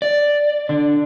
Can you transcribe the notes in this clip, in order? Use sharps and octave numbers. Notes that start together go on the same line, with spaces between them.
D5
D3